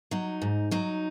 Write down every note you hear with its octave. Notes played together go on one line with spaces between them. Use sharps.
F#3 D#4
G#2
F#3 D#4